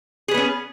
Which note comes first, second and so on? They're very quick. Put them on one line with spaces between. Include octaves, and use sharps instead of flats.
G#4 B4 B3 C#4